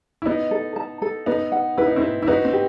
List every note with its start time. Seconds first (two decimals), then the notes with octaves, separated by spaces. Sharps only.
0.22 E4
0.26 B3 D#4 D#5
0.51 A4
0.76 A5
1.02 A4
1.26 B3 D#4 B4
1.52 F#5
1.78 E4 B4
1.87 D#4
1.96 C4 E4
2.02 B4
2.23 E4
2.28 D#4 F#4 B4
2.45 C4
2.53 G4